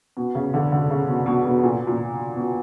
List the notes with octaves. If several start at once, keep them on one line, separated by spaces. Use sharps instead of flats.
B2
C#3
D3
D3
C#3
B2
B2
B2
A#2
A#2
B2